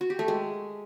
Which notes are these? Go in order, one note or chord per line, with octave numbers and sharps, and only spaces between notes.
F#4
G4
A3
G#3